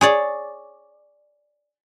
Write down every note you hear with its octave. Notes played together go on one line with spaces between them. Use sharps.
G#4 C#5 D5